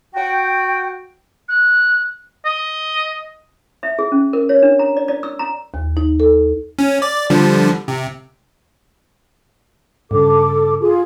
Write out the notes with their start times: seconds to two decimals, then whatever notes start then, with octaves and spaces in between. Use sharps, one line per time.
0.15 F#4 G5
1.49 F#6
2.45 D#5
3.83 E5
3.99 G#4
4.12 C#4
4.33 A#4
4.49 C#5
4.63 D4
4.79 A#5
4.97 D5
5.08 D5
5.23 E6
5.39 A#5
5.74 D#2
5.97 D#4
6.20 A4
6.79 C#4
7.02 D5
7.30 D3 F3 G3
7.88 C3
10.11 G2 C#3 A4 D6
10.80 F4 G#4